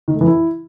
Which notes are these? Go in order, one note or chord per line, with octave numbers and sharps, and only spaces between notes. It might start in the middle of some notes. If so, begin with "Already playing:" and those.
D#3
A3
E3
E4